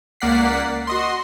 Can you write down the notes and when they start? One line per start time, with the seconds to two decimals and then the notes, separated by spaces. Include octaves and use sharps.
0.20 C#2 A#3 D5 F#5 B6 C7
0.87 F#4 D#5 C6